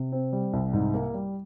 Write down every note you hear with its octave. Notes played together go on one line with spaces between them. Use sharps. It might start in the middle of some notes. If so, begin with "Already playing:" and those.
Already playing: C3
C4
G3
C2
G#2
A#3
G3